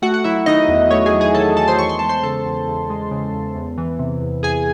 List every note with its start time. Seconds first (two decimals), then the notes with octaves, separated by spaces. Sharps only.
0.02 A3 F#4 F#5
0.14 F#5
0.24 F#3 E4 E5
0.46 D#3 D#4 D#5
0.68 E2
0.91 A3 C#5
1.06 G#4 G#5
1.12 F#3
1.21 G#4 G#5
1.34 D#3 A4 A5
1.57 E2 A4 A5
1.68 C5 C6
1.79 E2 C#6
1.89 C6
1.99 G#3 A5
2.09 C5 C6
2.23 C#3 A4 A5
2.45 E2
2.68 E2
2.90 G#3
3.11 C#3
3.33 E2
3.55 E2
3.78 E3
3.99 C3
4.22 E2
4.43 E2 G#4 G#5